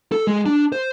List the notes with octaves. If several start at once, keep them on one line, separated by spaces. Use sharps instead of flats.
A4
G#3
D4
C5